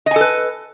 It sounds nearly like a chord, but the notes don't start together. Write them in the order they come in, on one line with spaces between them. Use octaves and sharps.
D#5 G#5 A4 B4